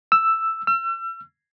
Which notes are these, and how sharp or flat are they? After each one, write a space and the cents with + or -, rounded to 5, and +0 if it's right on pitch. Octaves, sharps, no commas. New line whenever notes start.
E6 +5
E6 +40